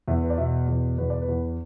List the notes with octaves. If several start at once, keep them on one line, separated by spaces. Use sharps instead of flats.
E2 E5
B4
D5
B2 E5
E2
E2 B4
D5
B4
E2